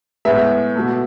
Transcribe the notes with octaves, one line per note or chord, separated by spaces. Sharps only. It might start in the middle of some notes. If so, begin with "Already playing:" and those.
A2 G#3 B3 E5
B2 A3